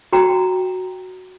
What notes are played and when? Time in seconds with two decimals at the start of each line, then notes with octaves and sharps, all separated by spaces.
0.13 F#4 G5 A#5